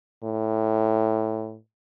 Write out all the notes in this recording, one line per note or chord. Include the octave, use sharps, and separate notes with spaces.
A2